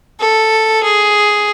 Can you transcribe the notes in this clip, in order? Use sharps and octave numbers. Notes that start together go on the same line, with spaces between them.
A4
G#4